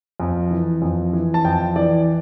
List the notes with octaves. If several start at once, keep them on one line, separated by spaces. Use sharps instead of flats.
F2
E3
F2
E3
A5
F2 G5
E3 D5